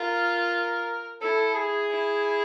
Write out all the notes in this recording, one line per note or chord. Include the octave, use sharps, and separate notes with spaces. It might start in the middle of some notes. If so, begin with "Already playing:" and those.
Already playing: F4 A#4
E4 A4
G#4
E4